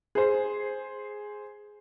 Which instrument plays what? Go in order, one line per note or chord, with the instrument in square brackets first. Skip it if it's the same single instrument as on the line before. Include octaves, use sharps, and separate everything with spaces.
[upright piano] G#4 C5